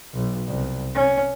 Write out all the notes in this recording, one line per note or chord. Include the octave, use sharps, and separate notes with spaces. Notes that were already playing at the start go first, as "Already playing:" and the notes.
B1
C2
C#4